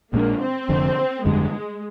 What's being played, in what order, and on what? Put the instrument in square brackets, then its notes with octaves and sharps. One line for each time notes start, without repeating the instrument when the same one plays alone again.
[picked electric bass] A#1 A#2 G#3 D4 [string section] A#3
[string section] C4
[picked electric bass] F1 F2 D3
[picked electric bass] G1 F2 D3 G3 [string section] G#3